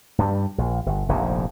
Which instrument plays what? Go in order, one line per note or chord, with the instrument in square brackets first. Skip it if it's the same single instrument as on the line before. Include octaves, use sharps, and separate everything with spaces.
[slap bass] G2 G3
A#1
G1
F1 A#1 G#2 C3